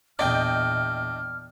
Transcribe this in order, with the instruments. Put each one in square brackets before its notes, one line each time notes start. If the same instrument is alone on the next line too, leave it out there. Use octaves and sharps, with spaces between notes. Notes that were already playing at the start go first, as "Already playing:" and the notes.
[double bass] E2 A#2 [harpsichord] D4 [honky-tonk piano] D#5 G5 G6 [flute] F6